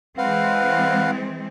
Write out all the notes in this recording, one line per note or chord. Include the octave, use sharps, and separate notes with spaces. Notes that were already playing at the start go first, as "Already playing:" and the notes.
E3 G#3 C4 B4 F5 F#5